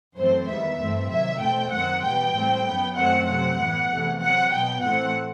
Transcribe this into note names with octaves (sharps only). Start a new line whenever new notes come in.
F#2 E3 A3 C4 C5
E2 D#3 G3 B3 E5
G2 E3 A3 C4
C3 D#3 F#3 E5
E2 B2 A3 C4 G5
F#2 D#3 F#3 C4 F#5
E2 B2 G3 B3 G5
A2 G3 C4
F#2 F#3 B3
F#2 D#3 F#3 A3 C4 F#5
C3 F#3 C4 F#5
A2 E3 B3
E2 C3 E3 A3
C3 F#3 C4 F#5
B2 F#3 B3 G5
A2 E3 A3 C4 F#5